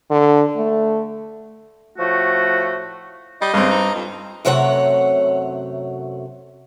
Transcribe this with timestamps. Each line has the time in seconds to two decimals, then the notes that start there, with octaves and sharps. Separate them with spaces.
0.10 D3
0.57 A3
1.98 A2 F3 A3 F#4
3.41 G3 D#5
3.54 G2 C#3 C4
3.71 D#4
3.95 F2
4.45 F#2 C3 F#3 A3 C#5 F#5